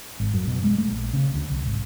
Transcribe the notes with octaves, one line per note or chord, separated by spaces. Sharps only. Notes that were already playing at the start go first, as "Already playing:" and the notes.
G#1
F#2
B2
G#3
A3
A#1
C#3
D2
C2
G#1